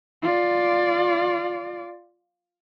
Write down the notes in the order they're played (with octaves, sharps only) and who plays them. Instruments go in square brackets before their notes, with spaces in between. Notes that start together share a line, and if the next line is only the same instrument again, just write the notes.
[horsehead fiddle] F4 D5